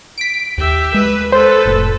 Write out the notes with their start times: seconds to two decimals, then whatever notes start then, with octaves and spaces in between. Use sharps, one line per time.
0.18 B6 D7
0.58 D#2 G4 E5
0.94 G#3 B4
1.32 A4 B4 C5
1.66 F1 A2